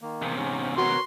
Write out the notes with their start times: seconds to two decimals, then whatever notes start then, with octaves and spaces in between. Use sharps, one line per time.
0.01 D#3 A#3
0.22 E2 C3
0.36 G#2 C#4
0.78 F#4 A#4 B4 C#5 C6